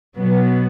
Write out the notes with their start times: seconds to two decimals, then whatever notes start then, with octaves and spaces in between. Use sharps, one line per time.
0.16 B2 F#3 B3